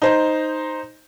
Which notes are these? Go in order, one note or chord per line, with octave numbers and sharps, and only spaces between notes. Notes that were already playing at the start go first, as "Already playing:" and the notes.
D#4 C5 A#5